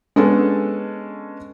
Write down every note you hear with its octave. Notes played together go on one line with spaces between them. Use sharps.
G#3 B3 C#4 D4 A4